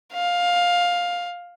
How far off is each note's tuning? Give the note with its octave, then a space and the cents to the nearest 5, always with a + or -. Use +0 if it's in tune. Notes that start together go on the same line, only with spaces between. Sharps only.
F5 +15